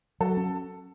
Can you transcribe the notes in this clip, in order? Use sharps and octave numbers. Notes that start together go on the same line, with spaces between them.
F#3 F#4 A4
C#4